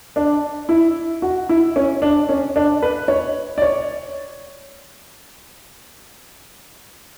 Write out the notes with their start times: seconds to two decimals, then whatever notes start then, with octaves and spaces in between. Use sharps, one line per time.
0.16 D4
0.69 E4
1.22 F#4
1.49 E4
1.76 C#4
2.02 D4
2.29 C#4
2.56 D4
2.83 B4
3.08 C#5
3.58 D5
3.62 C#5